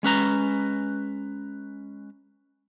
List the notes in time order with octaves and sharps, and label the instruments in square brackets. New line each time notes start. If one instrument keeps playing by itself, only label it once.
[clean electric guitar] G#3 C#4 B4 A#5